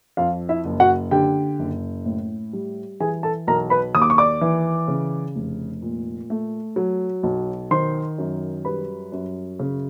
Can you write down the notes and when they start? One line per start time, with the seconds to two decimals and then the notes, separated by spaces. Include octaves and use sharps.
0.17 F2 F4 F5
0.49 E4 E5
0.65 F#1
0.80 F#4 F#5
1.11 D3 G4 G5
1.59 F#1
2.05 A2
2.53 G3
3.00 E3 G#4 G#5
3.23 A4 A5
3.47 B1 A#4 A#5
3.70 B4 B5
3.95 D#2 D#6
4.02 D6
4.10 C#6
4.18 D5 D6
4.41 E3
4.88 C#3
5.35 F1
5.82 A#2
6.30 A3
6.76 F#3
7.23 B1
7.71 D#3 C5 C6
8.18 F#2
8.65 G3 B4 B5
9.12 F#2
9.59 C#3